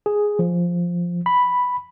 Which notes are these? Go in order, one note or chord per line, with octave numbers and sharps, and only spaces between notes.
G#4
F3
B5